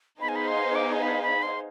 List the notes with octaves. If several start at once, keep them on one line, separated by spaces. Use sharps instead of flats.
B3 D#4 G#4 C5 F5 B5
G#5
B5
C6
D6
G#5
B5
B5
C6